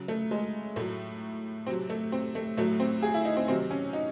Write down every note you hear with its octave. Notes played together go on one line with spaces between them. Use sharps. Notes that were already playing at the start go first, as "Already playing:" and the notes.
Already playing: C#3 F#3
A3
G#3
A2 F#3 A3
C3 F#3 C4
A3
C4
A3
A2 F#3 A3
C4
G#4
E4
D#4
C4
C3 D#3 F#3 C4
C#4
D#4